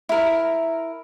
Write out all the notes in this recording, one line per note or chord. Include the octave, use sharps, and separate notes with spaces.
E4 A#4